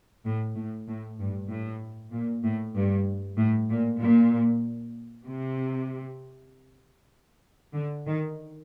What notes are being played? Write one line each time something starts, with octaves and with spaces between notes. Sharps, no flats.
A2
A2
A2
G2
A2
A#2
A2
G2
A2
A#2
A#2
C3
D3
D#3